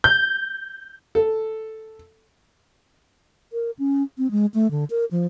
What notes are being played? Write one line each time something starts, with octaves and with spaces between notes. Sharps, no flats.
G6
A4
A#4
C#4
C4
G#3
A3
D3
A#4
F3